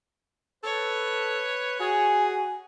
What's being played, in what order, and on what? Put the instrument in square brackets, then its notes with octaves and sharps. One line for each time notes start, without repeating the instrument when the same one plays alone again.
[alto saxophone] A4 [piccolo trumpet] B4 [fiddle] C#5
[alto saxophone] F#4 [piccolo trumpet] G#4 [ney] G#5